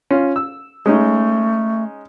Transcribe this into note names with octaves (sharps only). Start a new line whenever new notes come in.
C#4 F4
E6
G#3 A3 C#4 D#4